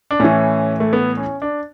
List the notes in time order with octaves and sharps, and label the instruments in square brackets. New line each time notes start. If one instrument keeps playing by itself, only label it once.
[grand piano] D4
A2 E3 C#4
A3
B3
C#4
D4